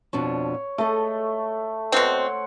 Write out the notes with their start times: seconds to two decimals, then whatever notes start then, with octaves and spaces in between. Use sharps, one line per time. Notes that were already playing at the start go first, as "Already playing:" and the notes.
0.13 F2 B2 D4 C#5
0.78 A3 A4 D#5
1.92 B2 C4 C5 C#5 F#5